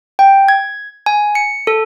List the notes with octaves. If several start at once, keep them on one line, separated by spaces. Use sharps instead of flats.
G5
G#6
G#5
C#7
A4